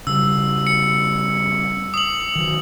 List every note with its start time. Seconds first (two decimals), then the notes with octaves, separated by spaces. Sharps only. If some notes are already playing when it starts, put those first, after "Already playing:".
0.07 C#3 G3 E6
0.67 C#7
1.94 D#6 F#7
2.35 D#3 F#3